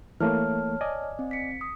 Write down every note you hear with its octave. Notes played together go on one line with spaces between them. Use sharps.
E3 A3 A#3 C#5 A5 F6
D5 D#5 G#5
C4
B6 C#7
D#6